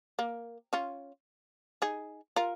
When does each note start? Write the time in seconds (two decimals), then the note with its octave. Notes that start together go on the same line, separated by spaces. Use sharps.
0.19 A#3
0.73 C#4 F4
1.82 D#4 G#4
2.36 F4 A#4